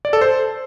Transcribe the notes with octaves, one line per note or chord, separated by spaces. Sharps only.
D5
A4
C5